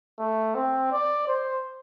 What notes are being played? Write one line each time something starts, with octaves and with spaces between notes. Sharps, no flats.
A3
C4
D5
C5